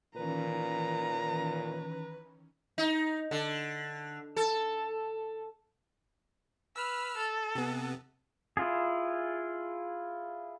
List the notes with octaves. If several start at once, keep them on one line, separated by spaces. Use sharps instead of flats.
A#2 D#3 E3 C#4 B4 A#5
D#4
D3
A4
B4 E6 F6
A4
C3 B3
E4 F4 G#4